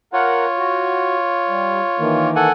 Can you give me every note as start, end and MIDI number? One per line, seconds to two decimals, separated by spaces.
0.13 2.31 65
0.13 0.46 70
0.13 2.31 73
0.13 0.46 78
0.58 1.16 66
1.48 1.80 55
1.99 2.48 51
1.99 2.48 52
1.99 2.48 58
2.36 2.52 69
2.36 2.52 78
2.36 2.52 80